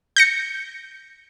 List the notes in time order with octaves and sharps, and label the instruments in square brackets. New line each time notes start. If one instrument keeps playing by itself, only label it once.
[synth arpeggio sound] G6 A#6 C#7